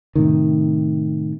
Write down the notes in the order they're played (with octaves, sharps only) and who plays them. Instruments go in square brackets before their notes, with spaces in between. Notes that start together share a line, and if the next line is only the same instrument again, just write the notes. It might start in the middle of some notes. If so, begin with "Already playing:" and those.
[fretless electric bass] A2 C3 D#3